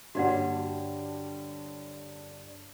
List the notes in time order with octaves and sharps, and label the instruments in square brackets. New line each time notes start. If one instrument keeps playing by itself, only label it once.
[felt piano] G2 A#3 C#5 [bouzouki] D3 G3 [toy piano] F#4 D5 F#5